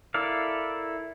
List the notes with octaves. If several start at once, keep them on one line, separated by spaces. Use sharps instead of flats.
E4 A4 A#4 D5 F5